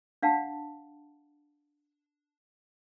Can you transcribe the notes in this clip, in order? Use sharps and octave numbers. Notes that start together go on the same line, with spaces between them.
D4 F5 F#5 A5